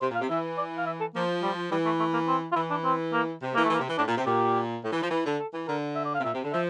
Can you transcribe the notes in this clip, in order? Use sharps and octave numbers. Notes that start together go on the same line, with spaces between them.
C3 C5
A#2
F5
C3
E3 E5
D5
F5
E5
A4
F3 A#3
G3
E3 G3
A3
A3
A#3
C4
F4
E3 E4
D4
C4
A#3
C3
E3 A#3
A3
E3
A#3
C3
E3
A2 D4
A#2
C3
A#2 G4
A2
E3
F3
E3
D3
A4
E3
D3 A#4
E5
D5
F5
C3
A#2 E5
C3
D3
F3 E5